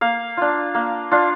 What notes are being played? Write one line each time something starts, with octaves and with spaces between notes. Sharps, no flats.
A#3 F5
D4 F4
A#3
D4 F4